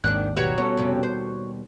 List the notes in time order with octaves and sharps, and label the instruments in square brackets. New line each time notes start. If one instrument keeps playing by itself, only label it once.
[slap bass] G#1 D#2 [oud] G#2 D#3 D4 [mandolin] F#6
[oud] B2 F#3 G3 [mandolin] F#4 C#5 A#5 [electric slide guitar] B4
[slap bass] B2 G3 [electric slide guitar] B3 A4 [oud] C#4
[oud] F2 C3 C#4
D#2 C5